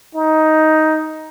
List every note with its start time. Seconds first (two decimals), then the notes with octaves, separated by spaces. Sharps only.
0.15 D#4